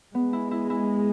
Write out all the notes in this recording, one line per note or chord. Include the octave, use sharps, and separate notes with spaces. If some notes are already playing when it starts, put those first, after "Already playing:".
G#3 B3
E4
E4
E4